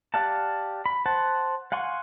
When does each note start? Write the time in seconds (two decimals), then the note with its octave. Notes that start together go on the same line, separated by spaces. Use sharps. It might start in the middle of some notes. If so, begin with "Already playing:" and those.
0.14 G4 D5 F5 F#5 A5
0.86 B5
1.06 C5 F#5 A5
1.72 F5 F#5 G#5 C6 C#6